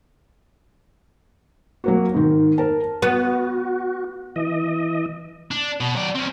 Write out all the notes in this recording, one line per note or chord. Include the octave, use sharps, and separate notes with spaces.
F#3 A#3 F#4
G#2 D#3
A#4 A5
B3 F#4
E3 D#5
D4
B2
F#3 D5
C4 C#4